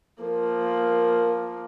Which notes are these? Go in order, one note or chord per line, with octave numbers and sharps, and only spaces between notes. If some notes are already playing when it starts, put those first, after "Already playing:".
F3 A#3 A#4